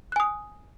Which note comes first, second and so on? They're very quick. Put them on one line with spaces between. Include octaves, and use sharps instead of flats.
F#6 G#5 D#6